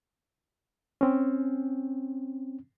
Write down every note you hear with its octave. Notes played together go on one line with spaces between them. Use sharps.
C4 C#4